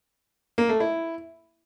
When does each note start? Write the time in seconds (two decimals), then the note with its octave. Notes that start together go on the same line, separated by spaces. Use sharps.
0.58 A#3
0.69 A3
0.80 E4